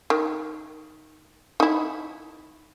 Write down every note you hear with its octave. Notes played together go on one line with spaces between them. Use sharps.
D#3
D#4 E4